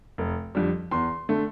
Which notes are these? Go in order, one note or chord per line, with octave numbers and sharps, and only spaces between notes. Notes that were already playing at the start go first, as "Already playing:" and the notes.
F1
F2 D3 G3
E2 C6
D3 A3